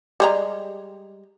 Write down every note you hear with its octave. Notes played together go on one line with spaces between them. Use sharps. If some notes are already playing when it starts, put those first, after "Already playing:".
G3 G#3 A#5